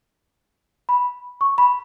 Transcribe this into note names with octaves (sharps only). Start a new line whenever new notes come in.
B5
C#6
B5